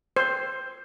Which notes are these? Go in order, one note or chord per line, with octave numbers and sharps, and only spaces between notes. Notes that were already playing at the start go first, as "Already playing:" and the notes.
C5